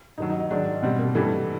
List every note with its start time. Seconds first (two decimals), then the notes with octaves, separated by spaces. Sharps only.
0.18 G2 D#3 F#3 D#4
0.29 D#4
0.40 D#4
0.51 G#2 D#3 F#3 D4
0.82 B2 G3 C4
0.99 A#3
1.15 G2 E3 G3 A3